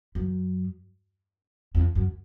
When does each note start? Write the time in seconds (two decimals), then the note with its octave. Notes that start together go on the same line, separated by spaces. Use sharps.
0.15 F#2
1.75 F2
1.95 F#2